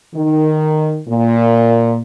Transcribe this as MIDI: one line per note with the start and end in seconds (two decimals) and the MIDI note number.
0.15 0.99 51
1.08 2.01 46